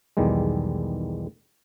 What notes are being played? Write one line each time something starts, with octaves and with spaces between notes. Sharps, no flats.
B1 E2 D#3 G3 G#3